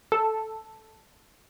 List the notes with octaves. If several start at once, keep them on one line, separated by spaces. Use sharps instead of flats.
A4